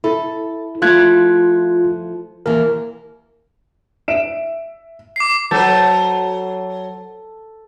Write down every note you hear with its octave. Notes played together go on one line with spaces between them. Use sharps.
E4 A4
F3 A3 E4 F4 F#6 G#6
D#2 E3 A#4
E5 D7 E7
D6 C7
F#3 A4 C5